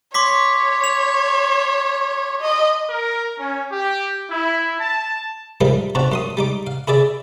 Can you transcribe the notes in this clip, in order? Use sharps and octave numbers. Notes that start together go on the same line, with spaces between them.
C#5 C6 D6 B6
F7
D#5
A#4
C#4
G4
E4
A5
E3 F3 G3 D#4 A#4 B5
B2 C4 D4 F4 F#4
F#2 C6 D#6
G3 D#4 D6
F5
E4 G#4 D5 E5